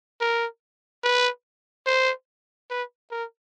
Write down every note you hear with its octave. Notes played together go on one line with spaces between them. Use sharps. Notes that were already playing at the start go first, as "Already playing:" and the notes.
A#4
B4
C5
B4
A#4